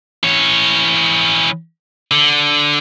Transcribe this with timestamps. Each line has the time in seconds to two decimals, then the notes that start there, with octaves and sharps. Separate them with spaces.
0.24 E3 C#5
2.11 D3